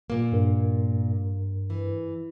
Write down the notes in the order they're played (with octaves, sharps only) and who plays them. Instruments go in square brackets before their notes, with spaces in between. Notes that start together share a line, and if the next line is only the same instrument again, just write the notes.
[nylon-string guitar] A#2 A#3
[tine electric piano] G2 A#4
[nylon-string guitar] E3